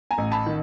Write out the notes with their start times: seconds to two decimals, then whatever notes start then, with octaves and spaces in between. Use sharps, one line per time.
0.11 G#5 A#5
0.18 A1
0.32 A5 B5
0.46 D#3